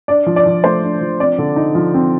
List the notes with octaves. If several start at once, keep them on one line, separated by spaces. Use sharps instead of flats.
D4 D5
F3
D5
F3
A3 C5
D4
F3
C4 D5
D3
D#4
F3
C4